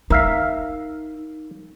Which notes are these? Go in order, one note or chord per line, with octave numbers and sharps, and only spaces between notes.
D#4 A#4 E5 F5